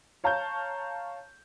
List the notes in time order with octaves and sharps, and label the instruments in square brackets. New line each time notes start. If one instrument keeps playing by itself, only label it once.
[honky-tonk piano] C#5 F5 A5 A#5 C#6 G6